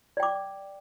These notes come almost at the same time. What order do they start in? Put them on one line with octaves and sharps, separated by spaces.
D5 G5 D6